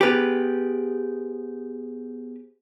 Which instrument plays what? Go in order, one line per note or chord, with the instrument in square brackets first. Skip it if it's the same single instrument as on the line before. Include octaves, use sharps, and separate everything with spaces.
[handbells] B3 G#4 C5 [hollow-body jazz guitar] G4 B4